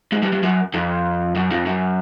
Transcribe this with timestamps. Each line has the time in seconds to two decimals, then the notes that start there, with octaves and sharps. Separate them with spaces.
0.12 G#2
0.22 G2
0.32 G2
0.43 F#2
0.74 F2
1.35 F#2
1.51 F2
1.66 F#2